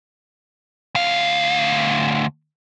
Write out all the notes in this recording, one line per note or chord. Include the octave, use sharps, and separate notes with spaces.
D2 F5